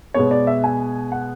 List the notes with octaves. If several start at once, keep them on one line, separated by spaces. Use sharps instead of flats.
B2 G#3 B3 C#5
D5
E5
G#5
F#5